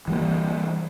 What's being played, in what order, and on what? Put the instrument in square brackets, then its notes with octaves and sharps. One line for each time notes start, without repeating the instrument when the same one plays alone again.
[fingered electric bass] E3 G3 A#3